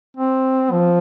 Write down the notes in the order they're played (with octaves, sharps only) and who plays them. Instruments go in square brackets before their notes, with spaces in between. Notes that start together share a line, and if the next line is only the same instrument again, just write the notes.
[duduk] C4
F3